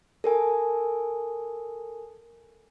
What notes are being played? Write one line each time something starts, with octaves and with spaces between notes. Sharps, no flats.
A4 A#4 G#5